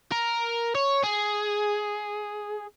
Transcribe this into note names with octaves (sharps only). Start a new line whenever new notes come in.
A#4
C#5
G#4